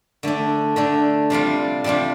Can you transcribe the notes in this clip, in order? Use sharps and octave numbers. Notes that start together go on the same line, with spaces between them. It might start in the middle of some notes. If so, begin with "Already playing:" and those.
D3 A3 D4
D3 A3 D4
C3 G3 D4 F4
C3 G3 D4 F4